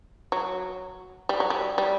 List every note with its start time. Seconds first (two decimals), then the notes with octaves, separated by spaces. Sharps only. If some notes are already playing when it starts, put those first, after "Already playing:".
0.32 F#3
1.29 G3
1.40 F#3
1.50 G3
1.78 G3